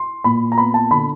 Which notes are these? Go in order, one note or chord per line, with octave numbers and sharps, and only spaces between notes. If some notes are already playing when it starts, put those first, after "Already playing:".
Already playing: C6
A#2 B5
A#5
B3 B5
A5
D3 B5